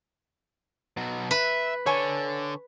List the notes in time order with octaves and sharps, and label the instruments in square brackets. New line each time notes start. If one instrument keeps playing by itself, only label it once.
[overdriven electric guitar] B2 F#3
[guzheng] B4 [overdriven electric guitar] E5
[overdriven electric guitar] D3 [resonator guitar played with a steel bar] C#5 G#5